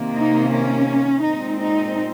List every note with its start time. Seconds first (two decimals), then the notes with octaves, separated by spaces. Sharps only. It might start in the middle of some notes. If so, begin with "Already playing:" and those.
Already playing: C3 D#3 A#3
0.16 D#4
0.53 C#4
1.24 A#2 G#3 C4 D#4
1.61 D#4